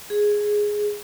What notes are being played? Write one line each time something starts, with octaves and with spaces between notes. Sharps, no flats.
G#4